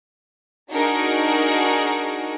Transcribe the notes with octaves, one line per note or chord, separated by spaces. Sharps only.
D4 D#4 F#4 G#4 A#4